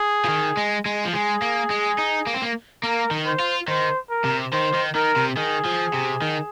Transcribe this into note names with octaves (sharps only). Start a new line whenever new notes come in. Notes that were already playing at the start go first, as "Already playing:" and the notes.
Already playing: G#4
F3
D#3
G#3
G#3
F3
G#3 G#4
A#3
G#3
D#4
A#3
C4
A#3
A#3 A#4
D#3
C5
F4
D#3 C5
A#4
C3
D#3 C5
D#3
D#3 A#4
C3
D#3 G#4
F3
C3
D#3